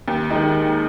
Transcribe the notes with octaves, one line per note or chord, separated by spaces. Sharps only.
D#2
D#3 G#3 D#4